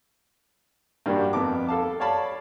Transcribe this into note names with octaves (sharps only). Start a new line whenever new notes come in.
G2 G3 A#3 D4 F#4
F2 A#3 B3 A5 D6
A4 F5 A5
C#5 D5 F5 A5 B5